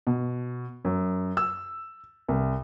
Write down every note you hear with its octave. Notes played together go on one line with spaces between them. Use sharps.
B2
F#2
E6
C2